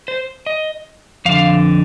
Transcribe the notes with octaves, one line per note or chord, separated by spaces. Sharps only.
C5
D#5
F2 D3 F5